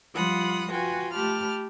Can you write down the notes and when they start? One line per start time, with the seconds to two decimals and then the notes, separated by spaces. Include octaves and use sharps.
0.14 F3 G3 F4 F#5 B5 D#6
0.72 F4 F#4 B4 G5 G#5
1.13 A3 G4 A5 B5 F6